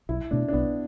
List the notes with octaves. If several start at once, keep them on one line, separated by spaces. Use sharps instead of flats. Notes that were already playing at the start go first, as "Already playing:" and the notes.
B1 E4
B2 A3 D4
D4
B1 B3